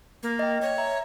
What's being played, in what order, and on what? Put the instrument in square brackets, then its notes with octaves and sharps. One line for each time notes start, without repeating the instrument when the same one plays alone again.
[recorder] A#3
[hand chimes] D#5 G5
[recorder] C#5
[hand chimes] E5 A#5